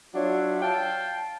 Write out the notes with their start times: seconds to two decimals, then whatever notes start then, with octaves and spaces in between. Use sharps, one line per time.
0.14 F#3 D4 F4 C#5 E5 F#5
0.62 F5 G5 A5